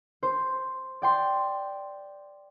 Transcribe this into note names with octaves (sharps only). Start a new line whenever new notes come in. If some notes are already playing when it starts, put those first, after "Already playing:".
C5
D5 G5 C6